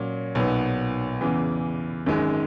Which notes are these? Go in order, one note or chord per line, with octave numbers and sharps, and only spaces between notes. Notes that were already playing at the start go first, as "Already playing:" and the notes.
Already playing: A#2 F#3 C#4
B1 A#2 F#3 B3 D#4
E2 C#3 E3
G#1 F#2 D#3 G#3